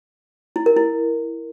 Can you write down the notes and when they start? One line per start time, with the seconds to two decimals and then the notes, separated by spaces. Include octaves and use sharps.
0.56 E4
0.66 A#4
0.77 E4